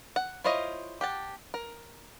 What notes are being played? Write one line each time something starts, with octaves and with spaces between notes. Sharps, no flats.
F#5
E4 F4 C5 C#5 D#5
G4 F#5 A5
A#4